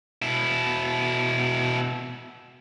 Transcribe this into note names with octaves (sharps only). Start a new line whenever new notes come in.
B2 E4